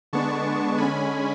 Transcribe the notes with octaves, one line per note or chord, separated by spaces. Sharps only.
D3 G#3 B3 D4 A5 C#6
D3 G#3 C#4 G#5 B5